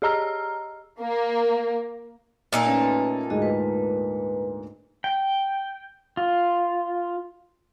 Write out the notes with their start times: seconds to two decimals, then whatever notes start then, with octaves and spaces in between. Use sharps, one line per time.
0.02 G4 G#4 D#5 A#5 E6 F6
1.00 A#3
2.52 A#2 D#4 A4
2.66 A3 C#4 B4
3.30 D2 G#2 G#3 F#4 G#4 D#5
3.42 B4
5.04 G5
6.17 F4